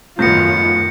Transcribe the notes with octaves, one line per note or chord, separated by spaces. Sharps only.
F#2 A2 D#3 B3 F4 G6 A#6 C#7